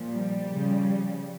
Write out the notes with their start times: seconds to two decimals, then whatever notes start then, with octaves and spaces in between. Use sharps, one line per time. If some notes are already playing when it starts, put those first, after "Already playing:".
Already playing: A#2 F3
0.09 G3
0.50 C#3 F3